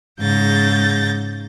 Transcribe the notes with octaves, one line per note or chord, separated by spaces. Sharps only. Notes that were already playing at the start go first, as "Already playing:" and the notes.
G#2 C#3 G6 A6 A#6